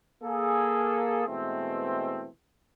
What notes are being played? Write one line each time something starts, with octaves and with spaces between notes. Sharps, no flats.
A#3 G#4 A4
B2 E3 G#3 A3 C4